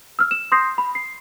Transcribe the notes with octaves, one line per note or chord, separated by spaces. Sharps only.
E6 F6
E7
C6 D#6 G6 A#6 C7
B5
C7